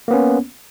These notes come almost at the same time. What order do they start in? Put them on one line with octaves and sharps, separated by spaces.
A#3 B3 C#4